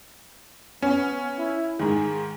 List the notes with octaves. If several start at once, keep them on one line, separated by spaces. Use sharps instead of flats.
B3 C#4
E4
G#2 D#3 G#4